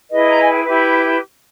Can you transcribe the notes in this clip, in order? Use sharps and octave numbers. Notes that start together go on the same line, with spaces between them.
E4 G#4 B4 D#5
A#5
G#5
G5
E4 G4 B4 E5